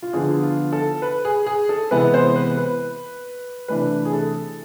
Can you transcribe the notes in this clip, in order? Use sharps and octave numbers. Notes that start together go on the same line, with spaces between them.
F4
D3 F3 B3 G#4
F4
A4
B4
G#4
G#4
A4
C3 E3 G#3 B3 B4
C5
B4
B4
C3 E3 A3 D4 B4
G#4
A4